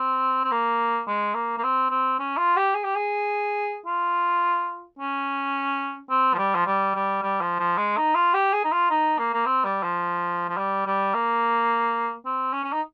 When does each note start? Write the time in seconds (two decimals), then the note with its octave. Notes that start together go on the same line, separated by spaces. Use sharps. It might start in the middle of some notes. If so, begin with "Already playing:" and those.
Already playing: C4
0.44 C4
0.52 A#3
1.07 G#3
1.34 A#3
1.58 A#3
1.63 C4
1.90 C4
2.19 C#4
2.37 F4
2.56 G4
2.75 G#4
2.84 G4
2.96 G#4
3.86 F4
4.99 C#4
6.10 C4
6.34 F3
6.38 G3
6.55 F3
6.66 G3
6.95 G3
7.23 G3
7.41 F3
7.59 F3
7.77 G#3
7.97 D#4
8.15 F4
8.34 G4
8.53 G#4
8.65 D#4
8.72 F4
8.90 D#4
9.19 A#3
9.34 A#3
9.46 C4
9.64 G3
9.83 F3
10.49 F3
10.57 G3
10.86 G3
11.14 A#3
12.25 C4
12.53 C#4
12.64 C#4
12.73 D#4